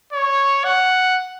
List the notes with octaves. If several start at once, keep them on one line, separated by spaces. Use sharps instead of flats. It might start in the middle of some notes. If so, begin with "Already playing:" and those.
C#5
F#5